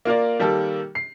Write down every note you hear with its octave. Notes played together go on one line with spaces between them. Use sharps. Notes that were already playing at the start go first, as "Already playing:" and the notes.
A#3 F4 A#4 D5
D#3 G3 A#3 G4 A4
C7